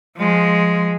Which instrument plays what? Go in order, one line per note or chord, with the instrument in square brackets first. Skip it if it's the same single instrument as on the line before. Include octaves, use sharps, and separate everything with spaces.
[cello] F3 G#3